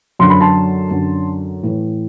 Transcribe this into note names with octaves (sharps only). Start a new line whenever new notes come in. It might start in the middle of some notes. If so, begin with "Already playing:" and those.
F#2 D3 F#3 C6
B5
A5 C6
F#2 D3 F#3
A2 E3